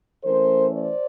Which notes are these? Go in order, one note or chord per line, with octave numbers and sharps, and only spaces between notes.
E3 A3 C#4 A#4 C5
C5 D5